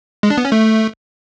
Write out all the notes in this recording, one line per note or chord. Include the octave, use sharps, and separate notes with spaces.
G#3
D4
B3
C#4
A3